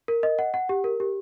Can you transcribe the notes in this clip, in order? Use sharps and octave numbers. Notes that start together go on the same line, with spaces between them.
A#4
D#5
F#5
F#5
G4
A#4
G4